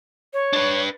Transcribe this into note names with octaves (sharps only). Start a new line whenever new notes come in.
C#5
D4 B4